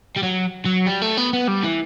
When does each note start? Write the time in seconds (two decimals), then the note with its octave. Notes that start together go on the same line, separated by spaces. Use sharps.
0.17 G3
0.23 F#3
0.66 F#3
0.86 G3
1.02 A3
1.17 B3
1.33 B3
1.48 G3
1.64 E3